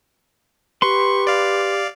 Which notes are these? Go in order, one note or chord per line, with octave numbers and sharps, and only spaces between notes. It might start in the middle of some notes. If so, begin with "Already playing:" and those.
G4 B4 C6 C#6
D5 F5